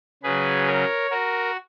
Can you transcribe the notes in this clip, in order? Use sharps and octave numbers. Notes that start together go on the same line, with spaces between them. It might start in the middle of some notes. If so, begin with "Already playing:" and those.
C#3 F#3 G#4 B4
A#4 C#5
F#4 A#4